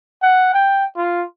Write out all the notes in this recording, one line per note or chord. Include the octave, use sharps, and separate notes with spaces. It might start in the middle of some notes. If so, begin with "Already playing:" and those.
F#5
G5
F4